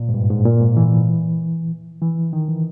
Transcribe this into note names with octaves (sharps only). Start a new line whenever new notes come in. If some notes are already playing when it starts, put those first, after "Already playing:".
Already playing: A#2
G#2
G2
G#2
A#2
G#2
E3
E3
D#3
E3